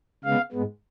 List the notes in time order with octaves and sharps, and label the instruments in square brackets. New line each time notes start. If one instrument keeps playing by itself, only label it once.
[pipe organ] C#3 G#3 B3 F5
G#2 G#3 B3